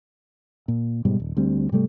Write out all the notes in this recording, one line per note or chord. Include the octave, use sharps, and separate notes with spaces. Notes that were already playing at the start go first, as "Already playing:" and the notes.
A#2
G#2 B2 G3 G#3
D#1
D2 G3 C4
G#2 C3 G3 A3